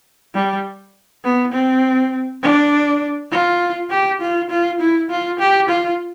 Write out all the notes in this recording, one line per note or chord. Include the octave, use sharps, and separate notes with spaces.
G3
B3
C4
D4
F4
G4
F4
F4
E4
F4
G4
F4